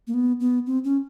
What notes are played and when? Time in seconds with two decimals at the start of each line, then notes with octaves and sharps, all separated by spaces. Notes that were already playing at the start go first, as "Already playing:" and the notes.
0.07 A#3
0.14 B3
0.40 B3
0.67 C4
0.84 C#4